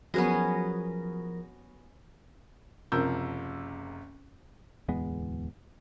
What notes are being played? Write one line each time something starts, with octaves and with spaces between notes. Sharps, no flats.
F3 F#3 B3 C#4 F#4 G#4 A#4 A#6
F#1 C3 F3 A#4 E6 G6
D1 E2 G#3 B3